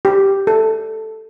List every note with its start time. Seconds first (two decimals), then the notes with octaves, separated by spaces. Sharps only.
0.05 G4
0.47 A4